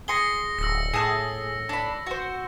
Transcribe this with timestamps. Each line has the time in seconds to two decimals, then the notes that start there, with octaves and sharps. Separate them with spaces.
0.08 G#4 C6 A#6 C#7 G7
0.59 D1 E6 A#6
0.93 A2 G#4 A5
1.69 D4 B5
2.06 F#4 C5